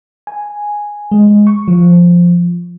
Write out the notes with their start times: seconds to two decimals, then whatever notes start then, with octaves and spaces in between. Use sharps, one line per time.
0.27 G#5
1.12 G#3
1.47 C#6
1.68 F3